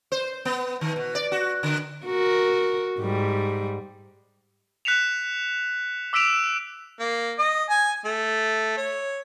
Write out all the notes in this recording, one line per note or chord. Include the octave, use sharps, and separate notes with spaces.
C5
B3
D#3
B2
D5
F#4
D3
F#4 A#4
G#2 G3
F#6 B6 C#7 E7 F7
D6 E6 B6 D7 E7 F7
A#3
D#5
G#5
A3
C#5